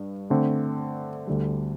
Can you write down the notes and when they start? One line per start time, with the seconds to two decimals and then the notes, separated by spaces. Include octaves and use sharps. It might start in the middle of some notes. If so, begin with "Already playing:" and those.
Already playing: G2
0.30 D3 A3 C4
1.27 D2 D3 G3